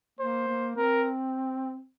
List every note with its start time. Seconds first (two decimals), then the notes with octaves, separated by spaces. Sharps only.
0.19 A#3 C5
0.48 A#3
0.76 C4 A#4